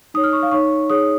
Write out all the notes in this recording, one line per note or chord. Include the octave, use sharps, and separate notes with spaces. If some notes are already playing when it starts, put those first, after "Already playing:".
D#4 C#5 D#6
F6
C#6
F5
D#4 C#5 C#6
D#4 G#4 C#5 D#6